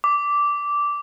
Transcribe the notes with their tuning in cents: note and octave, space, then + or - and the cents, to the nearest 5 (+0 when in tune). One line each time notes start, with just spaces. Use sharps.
D6 -10